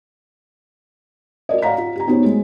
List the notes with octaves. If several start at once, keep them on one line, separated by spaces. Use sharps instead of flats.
F#4 A#4 D5 D#5
D5 F5 F#5 A#5 B6
F4
G4 A#5
B3 D#4 F#4 G4 C5 C#5
G#3